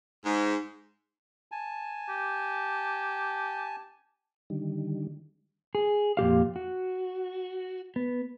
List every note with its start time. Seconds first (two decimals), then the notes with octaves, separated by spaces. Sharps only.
0.24 G#2
1.52 G#5 A5
2.09 G4
4.50 D3 D#3 G3
5.75 G#4
6.17 F2 A#2 G4 F5
6.56 F#4
7.96 B3